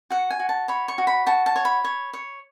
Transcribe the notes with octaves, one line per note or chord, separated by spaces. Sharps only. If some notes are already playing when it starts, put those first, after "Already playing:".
F#4 F#5
G#5
F#4
A5
C#5 B5
C#6
F#4
B5
F#4 A5
A5
C#5
B5
C#5
C#5